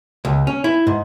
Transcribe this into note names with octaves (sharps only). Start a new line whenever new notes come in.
C#2
C#4
E4
G#2